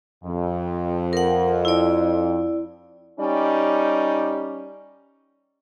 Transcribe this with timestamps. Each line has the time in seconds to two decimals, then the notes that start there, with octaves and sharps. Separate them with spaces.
0.24 F2
1.13 A#4 F#5
1.65 E4 D5
3.19 G3 C#4 D#4 D5